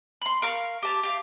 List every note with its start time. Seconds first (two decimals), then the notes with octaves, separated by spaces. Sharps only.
0.22 B5 C6
0.42 A#4 F5 C#6 F6
0.82 G4 A5
1.03 G4 F5